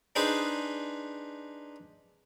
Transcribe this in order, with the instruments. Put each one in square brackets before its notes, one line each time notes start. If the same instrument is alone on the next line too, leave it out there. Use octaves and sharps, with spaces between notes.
[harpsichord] D4 D#4 G#4 B4 C5 D#5